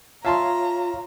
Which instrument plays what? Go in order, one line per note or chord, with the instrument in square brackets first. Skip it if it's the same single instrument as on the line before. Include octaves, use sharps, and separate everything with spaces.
[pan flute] F4 [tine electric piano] C#5 F5 [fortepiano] E5 A5 C6 [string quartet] A#5